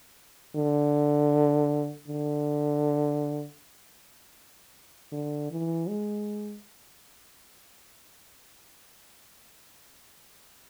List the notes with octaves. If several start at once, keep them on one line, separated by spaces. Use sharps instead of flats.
D3
D3
D3
E3
G#3